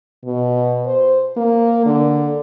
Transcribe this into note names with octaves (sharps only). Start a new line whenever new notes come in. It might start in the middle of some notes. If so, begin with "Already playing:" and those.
B2
C5
A#3
D3